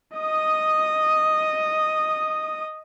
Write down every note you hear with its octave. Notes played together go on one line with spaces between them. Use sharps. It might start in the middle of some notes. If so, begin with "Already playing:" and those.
D#5 D#6